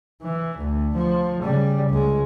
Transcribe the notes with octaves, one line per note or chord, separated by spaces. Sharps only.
E3
D2
F3
C#3 G3
C#2 G#3